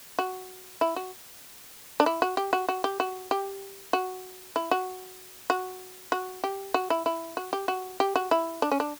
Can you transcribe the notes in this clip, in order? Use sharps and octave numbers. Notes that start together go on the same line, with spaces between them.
F#4
E4
F#4
D4
E4
F#4
G4
F#4
F#4
G4
F#4
G4
F#4
E4
F#4
F#4
F#4
G4
F#4
E4
E4
F#4
G4
F#4
G4
F#4
E4
D4
C#4
D4